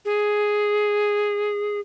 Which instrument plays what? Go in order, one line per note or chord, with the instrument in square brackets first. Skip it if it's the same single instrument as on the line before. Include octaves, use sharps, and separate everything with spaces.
[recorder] G#4